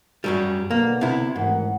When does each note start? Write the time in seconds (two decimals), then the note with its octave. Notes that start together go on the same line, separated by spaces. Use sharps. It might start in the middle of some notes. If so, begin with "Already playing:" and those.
0.24 F#2 F#3 G3
0.71 B1 D3 A#3 B3
1.01 C3 E4
1.36 A1 G#2 D#3 F#5